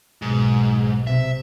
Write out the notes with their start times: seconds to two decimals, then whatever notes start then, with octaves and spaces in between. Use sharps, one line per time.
0.22 B1 G#2
1.07 C3 E5